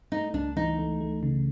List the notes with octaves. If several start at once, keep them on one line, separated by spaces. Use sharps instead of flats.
A3 D#4
C#2 D4
E3 D#4
A3
A3
C#3